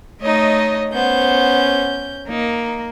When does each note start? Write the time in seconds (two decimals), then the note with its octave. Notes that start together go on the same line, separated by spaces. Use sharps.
0.21 A3 D#4 C#5 D#5
0.92 B3 C#4 C5 G6
2.29 A#3 D#4